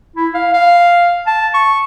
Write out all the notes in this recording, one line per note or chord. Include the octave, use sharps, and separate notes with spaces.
E4
F5
F5
A5
C#6